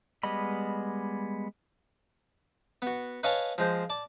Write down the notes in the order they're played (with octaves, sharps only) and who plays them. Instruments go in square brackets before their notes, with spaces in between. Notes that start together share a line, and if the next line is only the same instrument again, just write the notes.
[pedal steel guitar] G3 G#3 B3 D#5 B5
[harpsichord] B3 F#4
B4 C#5 D#5 F5 G#5 A5
F3 G#3 C5
D5 A5